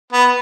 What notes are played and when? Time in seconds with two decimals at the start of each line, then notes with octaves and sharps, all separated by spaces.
0.13 B3